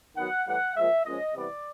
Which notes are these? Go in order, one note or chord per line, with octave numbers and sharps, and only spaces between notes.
D#3 F#3 B3 F#5
A2 E3 G3 F#5
A#2 F3 G#3 E5
A#2 F3 G#3 C#4 D#5
C3 E3 G3 B3 D5